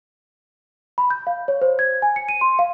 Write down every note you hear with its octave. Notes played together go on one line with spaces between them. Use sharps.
B5
G6
F5
C#5
C5
G#6
G#5
C#7
D#7
C6
F5